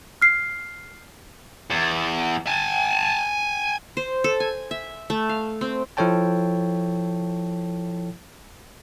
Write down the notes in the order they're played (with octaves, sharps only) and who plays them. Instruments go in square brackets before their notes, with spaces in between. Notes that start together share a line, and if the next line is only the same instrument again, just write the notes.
[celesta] F6 C7
[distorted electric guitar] E2
G#5 A5
[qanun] C5
A4
G#5
E5
A3
F5
C4
[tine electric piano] F3 E4 A4 C#5 G5 A5